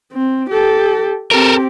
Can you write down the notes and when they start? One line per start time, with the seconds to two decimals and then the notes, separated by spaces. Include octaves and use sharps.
0.12 C4
0.50 G4 A4
1.31 C4 G4 A4 A#4